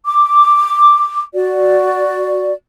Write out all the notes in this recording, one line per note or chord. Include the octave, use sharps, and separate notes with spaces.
D6
F#4 D5